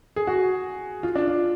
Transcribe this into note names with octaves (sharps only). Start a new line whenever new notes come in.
G#4
F#4
F4
D4
F4